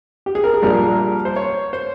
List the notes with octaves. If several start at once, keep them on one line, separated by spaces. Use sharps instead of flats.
G4
G#4
A#4
G#4
A#1 A#2 G3 A#4
C5
C#5
C5